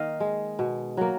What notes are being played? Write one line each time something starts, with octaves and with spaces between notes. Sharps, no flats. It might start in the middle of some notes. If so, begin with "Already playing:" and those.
Already playing: D#3 A#3 D#5 F5
G#3
B2
F#3 A#3